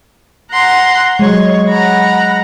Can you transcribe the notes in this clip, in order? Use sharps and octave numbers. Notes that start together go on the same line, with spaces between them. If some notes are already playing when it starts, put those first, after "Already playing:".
F#5 A#5 C6
F#3 G#3 C#5
F#5 A#5 B5